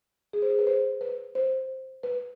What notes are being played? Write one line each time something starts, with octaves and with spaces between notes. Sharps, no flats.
G#4
C5
G#4
B4
C5
B4
C5
B4